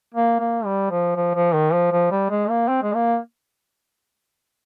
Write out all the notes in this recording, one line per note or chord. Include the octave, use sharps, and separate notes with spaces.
A#3
A#3
G3
F3
F3
F3
D#3
F3
F3
G3
G#3
A#3
C4
G#3
A#3